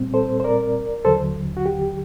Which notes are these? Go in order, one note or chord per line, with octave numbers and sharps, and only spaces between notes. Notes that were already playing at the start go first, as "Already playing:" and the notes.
Already playing: A#2 G3 C4
A4 C5
C5
A#4 D5
D#2 D3 F#3 A4 C5
F#4
G4